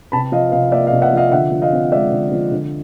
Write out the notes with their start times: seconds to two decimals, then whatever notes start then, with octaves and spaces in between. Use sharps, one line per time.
0.12 C3 A5 B5
0.32 F3 D#5 F5
0.52 C3 D#5 F5
0.72 A#3 D5 E5
0.87 D#5 F5
0.92 C3
1.02 E5 F#5
1.13 F3 D#5 F5
1.32 D3 E5 F#5
1.52 F3
1.62 D#5 F5
1.73 C4
1.92 G#3 D5 E5
2.12 D3
2.32 F3
2.52 D3